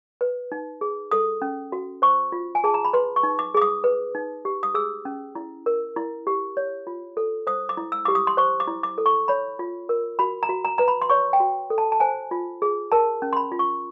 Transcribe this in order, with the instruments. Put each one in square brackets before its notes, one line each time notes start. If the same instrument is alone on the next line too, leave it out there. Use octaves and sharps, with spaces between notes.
[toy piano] B4
D#4
G#4
A4 D#6
C#4
F#4
C5 C#6
F4
G#5
G#4 A5
A#5
B5
B4 C6
C#6
D#4
D6
G#4 D6
D#6
B4
D#4
G4
D#6
G#4 E6
C#4
E4
A#4
E4
G4
C#5
F4
A4
C5 D#6
D6
E4
E6
G4 D6
D#6
C6
C5 C#6
D6
E4
D6
A4
C#6
C#5 B5
F4
A#4
F#4 B5
A#5
F#4
A#5
B4 A#5
B5
C6
C#5 C#6
G5
F#4
A4
A5
A5
C5 G#5
F4
G#4
A#4 A5
C#4
C6
B5
F4
C#6